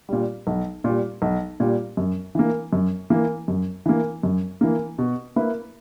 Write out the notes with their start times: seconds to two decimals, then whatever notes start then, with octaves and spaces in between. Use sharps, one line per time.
0.09 A#2 G3
0.47 B1
0.84 A#2 G3
1.22 B1
1.60 A#2 G3
1.97 F#2
2.35 E3 A#3
2.73 F#2
3.10 E3 A#3
3.48 F#2
3.86 E3 A#3
4.23 F#2
4.61 E3 A#3
4.98 B2
5.36 A#3 E4 B4